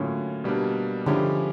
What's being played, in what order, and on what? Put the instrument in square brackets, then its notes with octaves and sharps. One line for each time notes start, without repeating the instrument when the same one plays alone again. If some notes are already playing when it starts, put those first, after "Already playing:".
Already playing: [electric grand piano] A2 F#3 A#3 C#4 F4 [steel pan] D3
[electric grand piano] B2 G3 A#3 D4
[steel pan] D3 [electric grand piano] F3 G#3 C#4 E4 G4